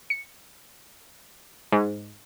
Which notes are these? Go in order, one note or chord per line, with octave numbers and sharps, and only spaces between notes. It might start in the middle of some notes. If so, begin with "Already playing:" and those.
C#7
G#2